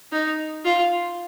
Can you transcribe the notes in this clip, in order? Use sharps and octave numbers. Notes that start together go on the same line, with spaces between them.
D#4
F4